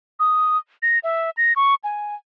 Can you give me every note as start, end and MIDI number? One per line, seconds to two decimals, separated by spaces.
0.20 0.57 87
0.82 0.99 94
1.04 1.30 76
1.37 1.53 94
1.56 1.75 85
1.84 2.15 80